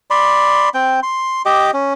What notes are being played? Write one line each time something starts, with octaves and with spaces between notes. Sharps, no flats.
D5 B5 C6
C4 G5
C6
G4 D#5 D6
C#4